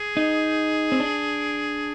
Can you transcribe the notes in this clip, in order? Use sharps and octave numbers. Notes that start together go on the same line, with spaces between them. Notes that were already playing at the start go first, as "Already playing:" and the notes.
Already playing: G#4
D#4
C4
D4